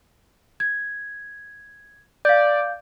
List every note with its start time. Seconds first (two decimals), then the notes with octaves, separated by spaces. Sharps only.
0.60 G#6
2.25 D5 F5 G6